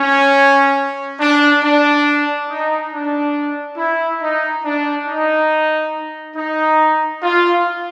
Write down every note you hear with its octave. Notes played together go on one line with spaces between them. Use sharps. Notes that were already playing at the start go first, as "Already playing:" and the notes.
Already playing: C#4
D4
D4
D#4
D4
E4
D#4
D4
D#4
D#4
F4